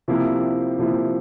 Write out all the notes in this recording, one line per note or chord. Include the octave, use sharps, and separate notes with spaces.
C3 F3 A#3 E4 G4
C3 F3 A#3 E4 G4